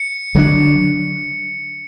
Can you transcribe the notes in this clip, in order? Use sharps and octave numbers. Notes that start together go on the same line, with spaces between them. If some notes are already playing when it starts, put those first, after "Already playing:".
Already playing: C#7
D3 F#3 B3 D4